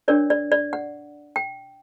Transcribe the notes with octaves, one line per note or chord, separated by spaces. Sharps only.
D4 A#4 C#5 D5
D5
D5
F#5
G5